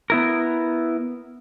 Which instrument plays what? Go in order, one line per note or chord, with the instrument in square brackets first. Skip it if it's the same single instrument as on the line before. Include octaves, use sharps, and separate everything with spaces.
[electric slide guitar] B3 E4 A#4